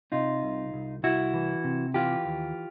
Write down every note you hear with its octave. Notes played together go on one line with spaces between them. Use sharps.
C3 D#4 F4
C2
C2
C2 E4 F#4
E3
C3
E3 F4 G4
D#2